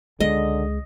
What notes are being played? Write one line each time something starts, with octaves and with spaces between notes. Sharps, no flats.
C#2 D3 G#3 D#5